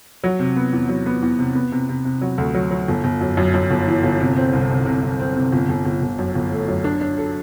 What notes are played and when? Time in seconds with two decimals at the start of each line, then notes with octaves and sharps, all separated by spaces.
0.24 F#3
0.39 C3
0.56 B3
0.73 E2
0.89 F#3
1.06 B3
1.22 E2
1.39 C3
1.55 B3
1.72 C3
1.89 C3
2.05 C3
2.21 F#3
2.38 D2
2.55 F#3
2.71 F#3
2.88 G1
3.04 G1
3.21 F#2
3.37 F#2
3.54 F#2
3.71 G1
3.87 E3
4.03 G1
4.20 C3
4.37 C4
4.53 C2
4.70 C3
4.86 C3
5.03 C3
5.19 C4
5.35 C3
5.52 G1
5.69 G1
5.85 G1
6.02 G1
6.19 F#2
6.35 G1
6.52 A3
6.68 F#2
6.84 D4
7.01 D4
7.18 A4